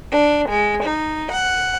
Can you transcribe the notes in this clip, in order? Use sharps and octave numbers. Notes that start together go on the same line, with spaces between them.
D4
G#3
D#4
F#5